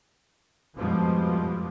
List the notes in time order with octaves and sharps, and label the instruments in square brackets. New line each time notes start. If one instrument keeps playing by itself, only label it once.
[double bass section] F2 G#2 B2 F3 G3 G#3